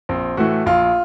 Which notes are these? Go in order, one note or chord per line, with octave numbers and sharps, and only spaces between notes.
A#1 C4
A2 E3 A3 F#4
A#1 F4